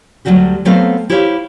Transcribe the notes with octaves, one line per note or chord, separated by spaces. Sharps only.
D2 B2 F#3 G3 F#4 G4
F#3 A3 B3 C4 A4 F5
E4 G4 C5 C#5 F5